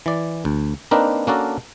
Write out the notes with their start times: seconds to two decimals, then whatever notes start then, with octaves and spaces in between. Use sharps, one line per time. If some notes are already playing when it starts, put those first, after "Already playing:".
0.06 E3 D5
0.45 D2
0.91 A#3 C4 D4 D#4 A#4 B4
1.27 A#3 C#4 D4 F#4 A4 A#4